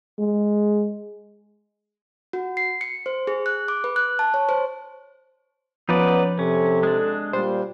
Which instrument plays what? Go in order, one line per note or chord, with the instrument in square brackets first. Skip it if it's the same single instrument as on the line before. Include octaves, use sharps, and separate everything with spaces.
[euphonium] G#3
[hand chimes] F#4
C7
C#7
C5
G#4
F#6
D6
B4
F#6
A5
C#5
C5
[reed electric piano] F3 [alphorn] B3 [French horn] C#4 [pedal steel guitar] D#4 B4 D5
[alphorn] C3 [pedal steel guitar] C#4 [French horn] A4
[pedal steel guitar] G#3 D4
[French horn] A#2 [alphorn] G3 [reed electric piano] C5